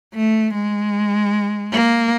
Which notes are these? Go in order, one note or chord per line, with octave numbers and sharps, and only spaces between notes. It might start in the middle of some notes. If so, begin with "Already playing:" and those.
A3
G#3
A#3